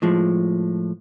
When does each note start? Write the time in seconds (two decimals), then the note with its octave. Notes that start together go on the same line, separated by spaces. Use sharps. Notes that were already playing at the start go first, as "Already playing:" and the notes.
0.02 A2 F3 G#3